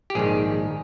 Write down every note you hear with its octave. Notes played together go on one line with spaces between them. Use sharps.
G4
A#1 G#2 D#3 G#4